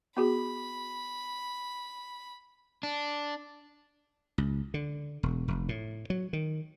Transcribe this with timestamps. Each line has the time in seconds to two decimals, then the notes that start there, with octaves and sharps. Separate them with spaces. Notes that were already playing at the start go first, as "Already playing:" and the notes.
0.17 B3 F#4 G#4 B5
2.83 D4
4.38 C#2
4.74 D3
5.23 E1
5.48 F1
5.69 A2
6.10 F#3
6.33 D#3